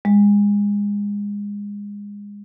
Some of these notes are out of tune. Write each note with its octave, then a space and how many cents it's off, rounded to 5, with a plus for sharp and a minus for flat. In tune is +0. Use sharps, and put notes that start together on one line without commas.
G#3 -25